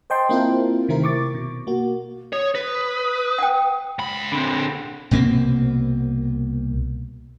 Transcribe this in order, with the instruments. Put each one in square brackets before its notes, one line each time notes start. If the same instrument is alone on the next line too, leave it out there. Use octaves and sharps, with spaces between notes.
[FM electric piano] C5 D#5 G5 A5 C6
A#3 C4 E4 F4 A#4
C3 D#3 A3 C4 E4 A#4
C#6 D6 A6
B2
A#3 F#4
[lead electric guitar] C#5 [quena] D#6
[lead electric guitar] B4
[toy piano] F#5 G5
[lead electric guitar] C#2 B5
[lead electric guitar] D3 C4 [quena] B5
[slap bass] C2 B2 A#3 C4